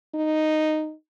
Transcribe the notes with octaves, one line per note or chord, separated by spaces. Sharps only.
D#4